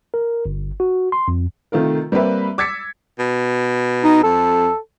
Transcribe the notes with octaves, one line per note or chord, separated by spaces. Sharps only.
A#4
G1
F#4
C6
F2
C3 D#3 A3 F4 A#4
G3 A#3 C4 B4 E5
D6 E6 G#6 A6 B6 C#7
B2
D#4
F2 A4